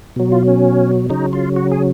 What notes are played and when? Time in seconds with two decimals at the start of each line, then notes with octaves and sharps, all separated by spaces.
0.16 B2 F#3
0.32 F4
0.48 C#4
1.09 C#3 F#3 D#4
1.33 F4
1.56 F#4
1.72 G#4